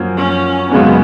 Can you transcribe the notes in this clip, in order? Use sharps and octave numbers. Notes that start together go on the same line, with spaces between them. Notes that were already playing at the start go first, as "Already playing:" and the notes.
Already playing: F#2 F3 A#3
C#4
F#2 C#3 G#3 B3 C#4